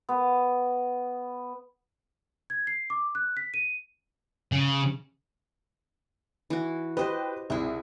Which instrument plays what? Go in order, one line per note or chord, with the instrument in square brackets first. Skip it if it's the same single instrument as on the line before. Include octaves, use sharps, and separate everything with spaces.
[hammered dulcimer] B3
[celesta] G#6
C7
D6
F#6
B6
D#7
[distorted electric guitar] C#3
[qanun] E3 F#4
[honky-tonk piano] G4 B4 [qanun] C5 D#5
[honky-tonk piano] C2 [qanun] E4 G#4